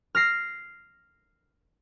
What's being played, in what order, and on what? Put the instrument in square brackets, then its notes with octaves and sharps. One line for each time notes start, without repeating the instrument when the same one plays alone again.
[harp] F6 A#6 C7